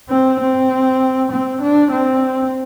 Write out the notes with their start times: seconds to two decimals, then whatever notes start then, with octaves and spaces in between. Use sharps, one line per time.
0.10 C4
0.40 C4
1.31 C4
1.62 D4
1.92 C4